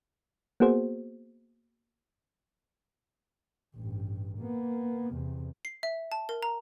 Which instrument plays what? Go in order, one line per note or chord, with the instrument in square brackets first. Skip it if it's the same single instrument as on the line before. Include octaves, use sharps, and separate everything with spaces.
[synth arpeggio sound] A#3 B3 F#4 G#4 C5
[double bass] A1 G2
A#3 B3
E2 C3
[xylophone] C7
E5
A5
A#4
A#5